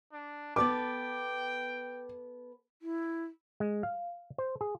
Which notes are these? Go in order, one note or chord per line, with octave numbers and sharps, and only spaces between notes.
D4
B3 A4 B4 G5 D6
E4
G#3
F5
C5
G#4